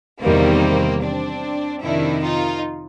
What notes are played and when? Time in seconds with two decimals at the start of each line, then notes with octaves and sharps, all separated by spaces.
0.22 E2 C3 D#3 G3 A#3 C4
1.02 C4 D4
1.82 F2 C3 D#3 D4 E4
2.23 D#4 F4